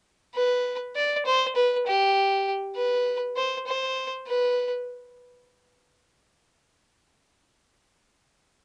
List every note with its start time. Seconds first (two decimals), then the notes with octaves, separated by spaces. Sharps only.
0.35 B4
0.96 D5
1.26 C5
1.56 B4
1.87 G4
2.76 B4
3.37 C5
3.67 C5
4.28 B4